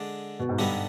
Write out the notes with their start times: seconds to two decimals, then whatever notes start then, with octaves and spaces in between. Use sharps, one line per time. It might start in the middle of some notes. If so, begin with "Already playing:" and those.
Already playing: D3 G#3 D4
0.39 B2
0.49 G#2
0.58 G2 D3 G3 B3 D#4